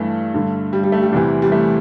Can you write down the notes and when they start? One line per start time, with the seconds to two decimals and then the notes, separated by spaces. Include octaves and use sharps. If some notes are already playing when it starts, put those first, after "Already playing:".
Already playing: G2 E3 A3
0.34 G2 D3
0.73 G3
0.83 G3
0.92 A3
1.03 G3
1.13 E2 C3 E3
1.42 G3
1.52 A3